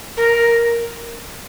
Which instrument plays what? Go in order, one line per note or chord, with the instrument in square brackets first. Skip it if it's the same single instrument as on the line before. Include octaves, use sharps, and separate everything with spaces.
[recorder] A#4